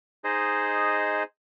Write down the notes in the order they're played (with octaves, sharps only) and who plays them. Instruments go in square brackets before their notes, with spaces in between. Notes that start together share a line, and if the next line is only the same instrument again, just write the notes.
[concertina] D#4 G#4 C5 D#5